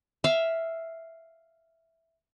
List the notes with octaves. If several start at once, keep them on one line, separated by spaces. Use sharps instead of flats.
E5 F5